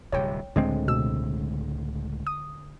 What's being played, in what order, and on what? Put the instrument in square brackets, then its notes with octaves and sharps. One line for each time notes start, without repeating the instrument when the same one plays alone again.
[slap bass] D1 C3 G3 [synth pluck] C#5 G5
[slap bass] C#2 A2 [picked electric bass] D3 G#3 C4
[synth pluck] B2 E6
D#6